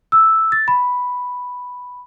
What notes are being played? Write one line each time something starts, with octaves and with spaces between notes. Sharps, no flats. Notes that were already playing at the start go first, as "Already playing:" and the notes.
E6
A6
B5